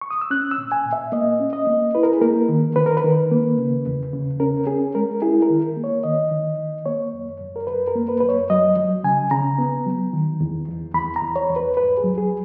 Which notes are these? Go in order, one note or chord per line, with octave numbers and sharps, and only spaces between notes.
C#6
D#6
E6
C#4 F#6
E6
A#2
G#5
A#2
E5
A#3 D#5
C#4
D#5
A#3
E4 B4
A#4
G#4
A#3 A#4
D#3
D#3 B4
A#4
B4
D#3
A#3
C#3
E2
C#3
C#4 A#4
C#4 G#4
G#3 A#4
E4 G#4
A#4
D#3
A#3
C#5
D#3 D#5
D#3
D#3
A#3 C#5
F#2
F#2
A#4
F#2 B4
A#4
A#3
B4
F#2 B4
C#5
F#3 D#5
F#3
C#3 G#5
C#3 A#5
B3
F#3
D#3
E2
E2
E2 B5
A#5
E2
C#5
E2
B4
G#2 B4
G#4
F#3
G#4